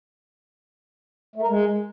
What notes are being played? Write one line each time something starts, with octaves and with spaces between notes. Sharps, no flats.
A3
A#4
G#3